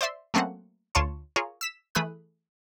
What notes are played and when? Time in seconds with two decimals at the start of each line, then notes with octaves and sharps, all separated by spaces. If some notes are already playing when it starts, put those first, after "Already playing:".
0.01 C5 D5 E5 C6
0.34 F#3 A3 A#3 C4 C#4 F#5
0.95 D2 F4 C#5 A5 C6
1.36 F4 G#4 A#4 C#5
1.61 E6 B6 E7
1.95 E3 A3 G#4 B5 D#6 F#6